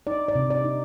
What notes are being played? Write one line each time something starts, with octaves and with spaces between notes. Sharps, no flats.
D#4 D5
D5
C3
D5
D#4